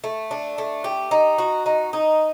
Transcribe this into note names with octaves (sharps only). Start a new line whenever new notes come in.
A3
D4
A3
G4
D#4
F#4
D#4
D#4